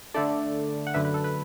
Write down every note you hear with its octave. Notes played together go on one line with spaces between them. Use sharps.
D3 A3 D4 A4 D5
F#5
F#2 D3 A3 D4 B4 E5
B4
A4
B4